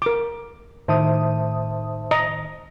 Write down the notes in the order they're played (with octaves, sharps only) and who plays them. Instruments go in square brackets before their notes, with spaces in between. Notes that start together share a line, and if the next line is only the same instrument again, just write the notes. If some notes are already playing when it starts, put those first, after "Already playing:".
[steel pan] A#4 D6
[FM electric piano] A2 D#3 D#6 [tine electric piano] C5 E5 A5
[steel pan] D#5 A#5